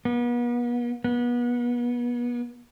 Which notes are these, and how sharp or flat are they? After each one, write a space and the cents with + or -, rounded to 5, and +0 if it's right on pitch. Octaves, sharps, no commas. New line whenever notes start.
B3 -40
B3 -30